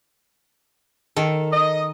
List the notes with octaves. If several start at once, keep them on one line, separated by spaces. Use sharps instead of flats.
D#3 A4
D#5